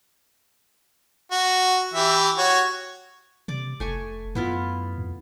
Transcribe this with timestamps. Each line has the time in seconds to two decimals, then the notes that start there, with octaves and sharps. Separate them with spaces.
1.31 F#4
1.94 E3 G4 E5
2.38 F#4 C#5
3.48 C3 D5 D6
3.80 F1 A3 G#5 C#6
4.35 F#2 B3 E4 F4
4.98 F2